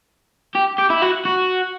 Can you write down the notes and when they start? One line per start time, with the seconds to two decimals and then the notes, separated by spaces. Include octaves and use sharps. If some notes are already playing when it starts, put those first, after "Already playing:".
0.55 G4
0.79 G4
0.90 E4
1.02 F#4
1.25 F#4